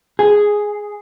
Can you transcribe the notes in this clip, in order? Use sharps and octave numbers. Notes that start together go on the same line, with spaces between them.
G#4